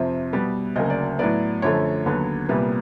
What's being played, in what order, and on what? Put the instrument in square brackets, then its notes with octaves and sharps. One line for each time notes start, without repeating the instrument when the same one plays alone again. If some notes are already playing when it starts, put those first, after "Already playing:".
Already playing: [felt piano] F2 C3 F3 E5
B2 G3 B3
D2 C#3 F#3 A#3 D#5
D5
A2 F#3 B3 D5
F#2 D3 F3 A3 C#5
D#2 D3 F#3 B3
C2 A#2 G3 B3 B4